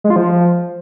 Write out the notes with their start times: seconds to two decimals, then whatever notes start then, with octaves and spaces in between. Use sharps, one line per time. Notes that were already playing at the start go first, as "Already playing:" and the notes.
0.04 G#3
0.10 F4
0.16 F3